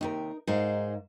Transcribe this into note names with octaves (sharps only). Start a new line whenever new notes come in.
D#2 C3 D#4 A#4
G#2 D#4 G#4 A#4 C5 F5